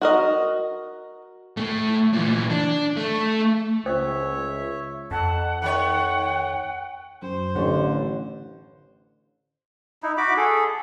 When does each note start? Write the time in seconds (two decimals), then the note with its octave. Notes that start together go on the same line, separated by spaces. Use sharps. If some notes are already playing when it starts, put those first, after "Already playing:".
0.01 F#4 A#4 D#5
1.57 A2 A3
2.13 A#2 E3
2.50 D4
2.96 A3
3.86 C#2 C5 C#5 E5
5.11 F2 F#5 A5
5.62 D#3 C#5 G5
7.22 F#2 C5
7.56 A1 D3 C#5 F#5
10.03 D#4 E4
10.18 F#4 B5 D6
10.37 G#4 A4